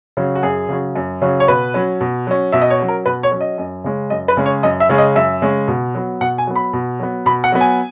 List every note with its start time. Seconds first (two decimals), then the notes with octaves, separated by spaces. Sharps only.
0.17 C#3 F#3 C#4
0.35 F#4
0.43 F#2 G#4
0.69 C#3 F#3 C#4
0.96 F#2
1.22 C#3 F#3 C#4
1.40 C#5
1.48 B2 B4
1.74 F#3 C#4
2.01 B2
2.27 F#3 C#4
2.52 B2 E5
2.62 D#5
2.70 C#5
2.80 F#3 C#4
2.88 A#4
3.06 B2 B4
3.23 C#5
3.32 F#3 C#4
3.41 D#5
3.58 F#2
3.84 C#3 G#3 C#4
4.10 F#2 D#5
4.28 B4
4.37 C#3 G#3 C#4
4.46 C#5
4.63 F#2 D#5
4.80 E5
4.89 C#3 G#3 C#4
4.98 D#5
5.16 F#2 E5
5.42 C#3 G#3 C#4
5.68 B2
5.95 F#3 B3
6.21 B2 F#5
6.38 G#5
6.47 F#3 B3
6.56 B5
6.73 B2
7.00 F#3 B3
7.26 B2 B5
7.44 F#5
7.52 F#3 B3
7.61 G#5